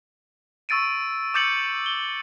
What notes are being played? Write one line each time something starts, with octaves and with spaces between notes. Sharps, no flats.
C#6 E6 A6 D7 D#7
D6 E6 G6 A6 C#7 F#7
G7